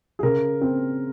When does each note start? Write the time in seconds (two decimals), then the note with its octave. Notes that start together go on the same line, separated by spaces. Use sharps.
0.19 G#4
0.23 C#3 A#4
0.61 C4